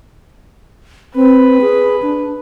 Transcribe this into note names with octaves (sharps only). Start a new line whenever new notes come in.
C4 B4
G#4
D4